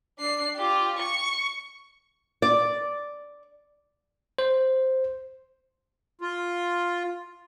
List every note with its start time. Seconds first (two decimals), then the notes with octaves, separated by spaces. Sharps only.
0.18 D4 C7
0.56 F4 G4
0.98 C#6 C#7
2.42 D5
4.39 C5
6.21 F4